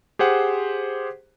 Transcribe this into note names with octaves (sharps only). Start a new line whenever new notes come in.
G4 G#4 C5 F#5